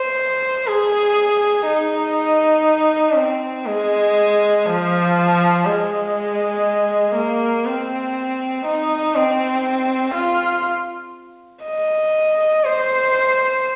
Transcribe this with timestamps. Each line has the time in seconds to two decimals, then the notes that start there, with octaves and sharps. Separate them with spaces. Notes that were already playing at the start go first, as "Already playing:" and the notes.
Already playing: C5
0.67 G#4
1.67 D#4
3.17 C4
3.67 G#3
4.66 F3
5.66 G#3
7.15 A#3
7.66 C4
8.66 D#4
9.16 C4
10.15 F4
11.65 D#5
12.64 C5